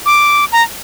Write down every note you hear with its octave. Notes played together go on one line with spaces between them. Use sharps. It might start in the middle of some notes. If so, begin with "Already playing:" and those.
D6
A#5